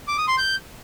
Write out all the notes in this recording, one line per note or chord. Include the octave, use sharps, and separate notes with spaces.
D6
D#6
C6
G6